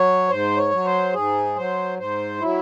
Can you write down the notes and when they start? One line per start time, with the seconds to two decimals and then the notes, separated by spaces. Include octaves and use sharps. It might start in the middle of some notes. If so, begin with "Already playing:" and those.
Already playing: F#3 C#5
0.29 G#2 C5
0.57 C#5
0.71 F#3
0.85 C5
1.13 G#2 G#4
1.56 F#3 C5
1.97 G#2 C5
2.40 F#3 E4